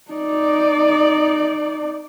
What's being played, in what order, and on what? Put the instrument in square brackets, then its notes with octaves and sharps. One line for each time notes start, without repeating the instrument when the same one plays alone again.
[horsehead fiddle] D#4 D5